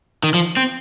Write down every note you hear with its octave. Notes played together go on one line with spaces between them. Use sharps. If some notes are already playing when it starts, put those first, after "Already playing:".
D#3
F3
C4